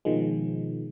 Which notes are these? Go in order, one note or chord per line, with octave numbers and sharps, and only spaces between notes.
B2 D#3 F3 G#3